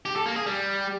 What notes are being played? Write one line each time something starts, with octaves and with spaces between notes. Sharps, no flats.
G4
A4
A#3
G#4
G3